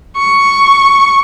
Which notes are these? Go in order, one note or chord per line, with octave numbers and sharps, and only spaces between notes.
C#6